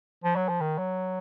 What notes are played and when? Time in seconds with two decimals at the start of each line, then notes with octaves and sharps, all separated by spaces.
0.24 F3
0.36 F#3
0.48 F3
0.61 D#3
0.78 F#3